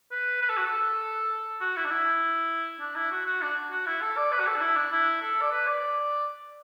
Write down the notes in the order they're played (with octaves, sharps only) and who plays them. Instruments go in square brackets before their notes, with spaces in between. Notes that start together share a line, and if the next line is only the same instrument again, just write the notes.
[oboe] B4
B4
A4
F#4
A4
F#4
E4
D4
E4
D4
E4
F#4
F#4
D4
F#4
E4
A4
D5
B4
F#4
A4
D4
E4
D4
E4
A4
D5
B4
D5